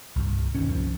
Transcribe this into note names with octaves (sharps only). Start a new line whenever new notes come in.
C2 G2
E1 D#2 D#3 C#4
C2 F3